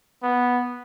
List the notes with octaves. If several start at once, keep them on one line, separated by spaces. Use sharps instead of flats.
B3